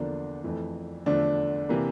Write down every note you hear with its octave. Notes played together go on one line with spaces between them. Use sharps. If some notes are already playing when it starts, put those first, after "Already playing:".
Already playing: E2 D3 F3 A#3 D4
F2 E3 A3
E2 D3 F3 A3 D4
C3 E3 A#3